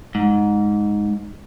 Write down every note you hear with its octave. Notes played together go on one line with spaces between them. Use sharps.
G#2